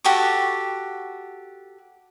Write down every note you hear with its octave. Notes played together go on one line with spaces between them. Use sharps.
F#4 G4 A4 C#6